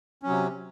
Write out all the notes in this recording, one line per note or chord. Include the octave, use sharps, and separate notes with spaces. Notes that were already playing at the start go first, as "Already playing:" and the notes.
C3 F#3 C#4